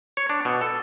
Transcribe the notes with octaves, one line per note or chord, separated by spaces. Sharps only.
C#5
D4
B2
A4